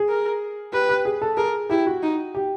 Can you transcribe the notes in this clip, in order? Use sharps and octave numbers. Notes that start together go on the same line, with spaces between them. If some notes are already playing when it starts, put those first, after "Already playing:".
Already playing: G#4
A#4
G4 B4
G4
G#4
A4
G#4 A#4
E4 G4
F#4
D#4
G4